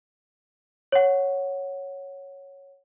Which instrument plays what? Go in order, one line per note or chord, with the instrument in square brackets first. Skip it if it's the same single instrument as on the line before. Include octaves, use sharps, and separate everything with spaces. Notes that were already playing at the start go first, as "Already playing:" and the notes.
[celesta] C#5 F#5